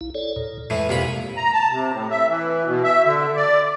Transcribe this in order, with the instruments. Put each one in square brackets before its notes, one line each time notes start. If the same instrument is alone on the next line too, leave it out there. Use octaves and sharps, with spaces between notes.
[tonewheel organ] A#1 E4
A4 C#5 D5
D#2 A#2
[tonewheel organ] F2 G#3 [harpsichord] A2 E3
[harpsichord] C2 A#2 B5 [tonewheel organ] F2 G#3 A#3
[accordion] A#5
A5
C3
A2
E5
E3
B2
E5
D3
D5